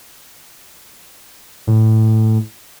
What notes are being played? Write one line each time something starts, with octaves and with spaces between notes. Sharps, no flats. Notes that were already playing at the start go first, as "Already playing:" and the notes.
A2